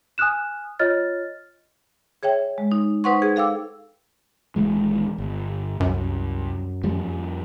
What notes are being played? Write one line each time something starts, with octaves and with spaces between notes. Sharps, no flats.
G#5 D#6 F6 F#6 E7
F4 C#5 D#5 F6 A6
G#4 C#5 E5 G5
G#3
D#4
D#4 B4 C5 F#5 C6 C#6
G#4
A4 F5 G5 D6 E6
D#1 E3 G#3
G1
C2 F#2
F2 F3 G3